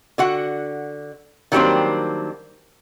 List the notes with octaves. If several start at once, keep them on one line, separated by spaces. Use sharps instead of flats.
D3 F#4 F#5
D#3 F#3 G3 A#3 C4 D4